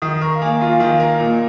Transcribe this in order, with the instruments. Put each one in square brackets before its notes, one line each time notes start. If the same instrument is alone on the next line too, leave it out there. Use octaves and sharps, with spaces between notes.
[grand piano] D#3 [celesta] D#6
[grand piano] A#4 [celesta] C#6
[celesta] F5
[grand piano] A#3 [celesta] G#5
[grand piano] F4 [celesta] F5
[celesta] G#5
[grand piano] D#3
[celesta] F5
[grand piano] A#4
A#2